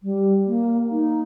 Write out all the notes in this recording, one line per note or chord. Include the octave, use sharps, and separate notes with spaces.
G3
A#3
D#4